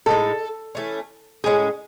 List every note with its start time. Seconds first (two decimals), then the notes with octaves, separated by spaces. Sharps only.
0.06 A2 G#3 D#4 A4
0.75 E3 A3 C#4
1.44 A2 G#3 C#4 G#4